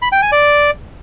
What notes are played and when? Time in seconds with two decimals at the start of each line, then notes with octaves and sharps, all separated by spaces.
0.02 B5
0.12 G5
0.22 G#5
0.32 D5